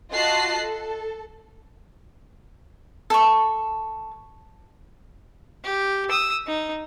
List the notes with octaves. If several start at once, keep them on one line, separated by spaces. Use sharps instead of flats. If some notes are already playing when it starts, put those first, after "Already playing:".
F4 F#4 D#5 A5 F#6 C7
A4
A4 C#6
G4
D#6 E6
D#4